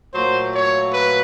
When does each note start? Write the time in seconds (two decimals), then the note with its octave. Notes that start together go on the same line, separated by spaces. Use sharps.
0.14 A#2 F#3 A3 C5
0.54 C#5
0.93 B4